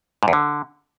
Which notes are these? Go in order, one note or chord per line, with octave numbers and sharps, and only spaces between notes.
G#2
E2
D3